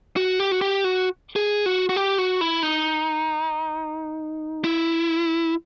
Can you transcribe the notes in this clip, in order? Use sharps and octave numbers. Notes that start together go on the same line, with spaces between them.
F#4
G4
F#4
G4
F#4
G#4
F#4
F#4
G4
F#4
E4
D#4
E4